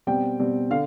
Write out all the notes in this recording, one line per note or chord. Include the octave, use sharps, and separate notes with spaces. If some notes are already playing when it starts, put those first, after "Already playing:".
B2 G3 C4 G5
B2 G3 C4
D3 F5